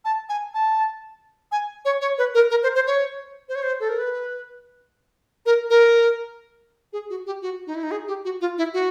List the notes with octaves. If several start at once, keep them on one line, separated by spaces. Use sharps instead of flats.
A5
G#5
A5
G#5
C#5
C#5
B4
A#4
A#4
C5
C5
C#5
C5
C#5
C5
A4
A#4
B4
A#4
A#4
G#4
F#4
G4
F#4
D#4
E4
D#4
G#4
G4
F#4
F4
E4
F#4